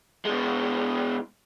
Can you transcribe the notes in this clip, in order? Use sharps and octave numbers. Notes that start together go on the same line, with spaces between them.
B2 G#3